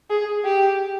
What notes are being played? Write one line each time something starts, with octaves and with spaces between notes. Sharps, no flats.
G#4
G4